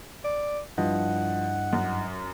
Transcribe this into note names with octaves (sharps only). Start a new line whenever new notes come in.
D5
G2 F3 E4 D#5 F#5
F#2